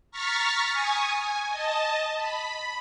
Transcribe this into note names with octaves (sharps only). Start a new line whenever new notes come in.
A#5 C#6 F6 A6 B6
G#5 C#6 D#6
G#5
D#5 A5
B5